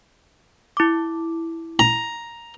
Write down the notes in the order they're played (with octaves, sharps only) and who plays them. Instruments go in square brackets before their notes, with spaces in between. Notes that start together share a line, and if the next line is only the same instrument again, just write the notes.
[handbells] E4 D6
[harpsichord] A#5